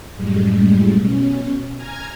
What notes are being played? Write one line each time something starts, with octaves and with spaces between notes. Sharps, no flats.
F#2 A2 G3 G#3
B2 C#4
G#5 A#5 F6 G#6